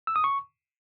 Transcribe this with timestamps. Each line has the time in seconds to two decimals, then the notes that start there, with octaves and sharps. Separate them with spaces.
0.07 E6
0.16 D#6
0.24 C#6